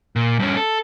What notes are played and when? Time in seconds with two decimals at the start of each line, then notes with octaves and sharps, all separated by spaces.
0.16 A#2
0.39 G2 C#4
0.57 A4